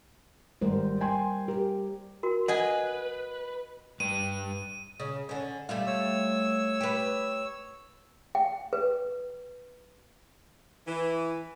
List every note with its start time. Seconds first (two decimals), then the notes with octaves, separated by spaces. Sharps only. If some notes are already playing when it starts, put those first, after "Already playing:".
0.61 G#1 G3 A#4 C5
1.01 G5 G#5 C6
1.48 G4 A#4
2.23 F#4 A#4
2.48 B4 D#5 F#5 G#5
4.00 G2 B4 D#7
5.00 C#3
5.29 D3 C#4
5.69 G3 A3 F4
5.86 C#5 E6
6.81 G4 B4
8.35 G5
8.73 B4
10.87 E3